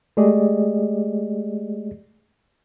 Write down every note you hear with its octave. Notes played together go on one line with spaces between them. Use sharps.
G#3 A3 G4 G#4 D5 D#5